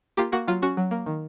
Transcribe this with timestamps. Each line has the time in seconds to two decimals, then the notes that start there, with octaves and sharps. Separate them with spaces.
0.17 A#3 F4 G4
0.32 A#3 F#4
0.47 F#3 F4
0.62 C#4 F#4
0.77 F#3
0.91 A#3
1.06 D#3